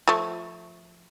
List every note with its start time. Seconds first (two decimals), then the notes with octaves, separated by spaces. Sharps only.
0.08 F3 A3